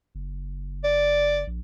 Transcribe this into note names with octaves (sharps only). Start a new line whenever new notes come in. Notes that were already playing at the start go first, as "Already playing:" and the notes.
F#1
D5
A#1